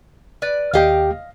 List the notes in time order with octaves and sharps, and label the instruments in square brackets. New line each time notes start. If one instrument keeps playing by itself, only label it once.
[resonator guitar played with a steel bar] B4 D5
[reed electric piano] D#2 G4 G5 [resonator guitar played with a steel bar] D#5 F5